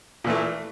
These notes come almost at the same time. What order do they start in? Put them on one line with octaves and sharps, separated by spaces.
A#2 E3 A3